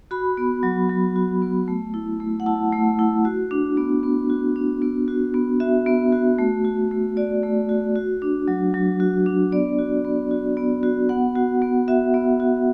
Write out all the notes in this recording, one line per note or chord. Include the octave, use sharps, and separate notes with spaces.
F#4 B5
B3
F#3
F#3
F#4
B3
A3
E4
A3
F#5
E4 A5
A3
E4
F#4
D4
B3
B3
F#4
D4
B3
F#4
B3
F#4 E5
B3
F#4
A3
F#4
A3
F#4 D5
A3
F#4
F#4
D4
F#3
F#3
F#4
D4
B3 D5
F#4
B3
F#4
B3
F#4
B3 F#5
F#4
B3
F#4 E5
B3
F#4